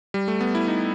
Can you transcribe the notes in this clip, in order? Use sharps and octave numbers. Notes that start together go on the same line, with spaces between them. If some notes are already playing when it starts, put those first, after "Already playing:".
G3
A3
B3
E4
D#4